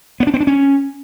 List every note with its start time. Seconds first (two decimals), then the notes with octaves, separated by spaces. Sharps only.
0.20 B3
0.27 D4
0.34 C4
0.40 D4
0.47 C#4